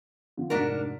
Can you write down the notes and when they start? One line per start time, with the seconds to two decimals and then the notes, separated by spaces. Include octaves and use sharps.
0.37 D3 F3
0.50 F1 G#2 D4 F#4 A#4 B6